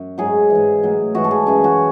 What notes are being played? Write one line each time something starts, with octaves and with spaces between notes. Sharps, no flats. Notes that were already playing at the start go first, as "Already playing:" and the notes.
Already playing: F#2
G#2 F#3 G#4
E3
G#2
A2 F#3
G#2 E3 F#4
A4
G#4
F#2 C#3 E3 G#4
F#4